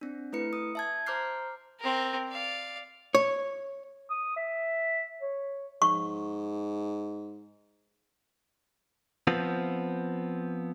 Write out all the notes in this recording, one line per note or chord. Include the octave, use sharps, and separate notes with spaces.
C4 D4
A3 E4 B4 C#7
D#6
E5 A5 G#6
C5 A#5 D6 F6 G6 C7
C4 A#4
D5 F5
C#5
D#6
E5
C#5
G#2 C#6
F3 B3 C4